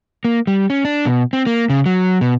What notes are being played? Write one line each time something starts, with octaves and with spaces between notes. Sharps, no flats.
A#3
G3
C#4
D4
B2
C4
A#3
C#3
F#3
B2